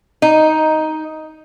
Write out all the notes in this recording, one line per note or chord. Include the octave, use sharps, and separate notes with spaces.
D#4